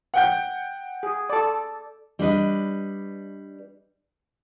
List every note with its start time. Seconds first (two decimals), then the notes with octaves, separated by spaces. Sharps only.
0.14 F#5 G5 G6
1.03 G#4
1.29 A4 D5
2.19 G3 D4 B4 D#5